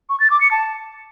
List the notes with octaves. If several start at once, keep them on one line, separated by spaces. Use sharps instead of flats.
C#6
A6
D6
C#7
A5